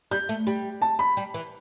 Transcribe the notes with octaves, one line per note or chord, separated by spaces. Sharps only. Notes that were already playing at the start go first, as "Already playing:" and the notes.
G3 G6
A3
G3
A5
B5
G3
E3